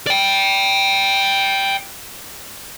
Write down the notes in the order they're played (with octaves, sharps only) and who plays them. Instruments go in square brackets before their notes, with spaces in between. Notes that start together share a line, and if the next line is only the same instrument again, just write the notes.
[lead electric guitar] D5 G5